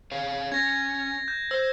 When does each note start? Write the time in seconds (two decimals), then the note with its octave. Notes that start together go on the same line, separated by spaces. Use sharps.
0.12 G#4 C#5 F5
0.52 C#4 G#6 A#6
1.28 G6
1.51 C5 E6